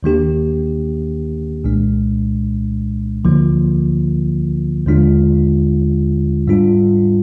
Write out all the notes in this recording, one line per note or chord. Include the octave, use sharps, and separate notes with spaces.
D#2 D#3 A#3 D4 G4
C2 A#2 G#3 D4
D2 D3 F3 A#3 F4
D#2 D3 G#3 D4 F4
G#2 G3 D4 F4